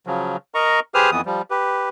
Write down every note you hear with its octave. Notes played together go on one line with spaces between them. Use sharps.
C#3 F3 F#3
A#4 D#5 A#5 C#6
G4 G#4 B4 C5 D#6 F6
F2 E3 B3 D#6
F3 G3
G4 B4